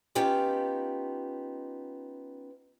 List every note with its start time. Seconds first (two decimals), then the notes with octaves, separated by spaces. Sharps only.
0.15 B3 C#4 D#4 F4 G4